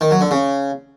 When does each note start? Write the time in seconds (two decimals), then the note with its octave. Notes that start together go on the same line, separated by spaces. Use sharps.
0.01 D#3
0.11 F#3
0.21 D3
0.31 C#3